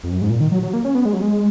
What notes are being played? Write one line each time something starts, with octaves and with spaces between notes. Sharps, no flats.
F2
F#2
G#2
A#2
D#3
F#3
F#3
A#3
C#4
B3
G#3
F#3
G#3